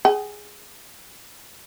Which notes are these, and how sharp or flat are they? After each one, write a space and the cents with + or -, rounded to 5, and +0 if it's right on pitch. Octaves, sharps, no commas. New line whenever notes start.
G#4 +0 F#5 +45